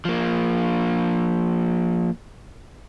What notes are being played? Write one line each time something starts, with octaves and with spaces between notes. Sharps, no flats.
F3 A#3